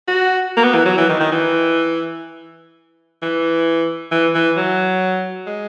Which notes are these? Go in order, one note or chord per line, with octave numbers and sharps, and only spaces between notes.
F#4
A#3
B3
E3
F#3
E3
D#3
D#3
E3
E3
E3
E3
F#3
G#3